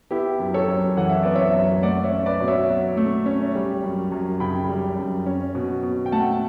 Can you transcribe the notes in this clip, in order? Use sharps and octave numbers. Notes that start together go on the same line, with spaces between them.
B3 E4 G4
F#2
A4 C#5
F#2
E3 F#5
E5
B3 D5
C#5 E5
F#2
A3 D5 F#5
C#5 E5
C#4
B4 D5
B2
C#5 E5
F#3
A3
C#4
G3
F#2
F#2
C#3 G5 B5
G3
F#2
C#4
B2
B2
G5
A3 F#5 A5